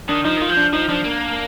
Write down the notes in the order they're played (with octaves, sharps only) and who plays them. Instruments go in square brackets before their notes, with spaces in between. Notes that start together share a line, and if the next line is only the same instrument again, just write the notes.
[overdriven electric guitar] D#3 [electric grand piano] D4
[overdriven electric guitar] F3 [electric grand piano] D#4
[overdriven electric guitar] D#3 [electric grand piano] F4
[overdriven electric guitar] F3
[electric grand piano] D4
[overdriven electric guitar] F3 [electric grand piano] D#4
[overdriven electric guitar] F3 [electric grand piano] D4
[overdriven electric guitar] A#3